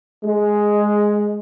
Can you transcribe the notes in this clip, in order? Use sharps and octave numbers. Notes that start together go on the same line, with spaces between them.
G#3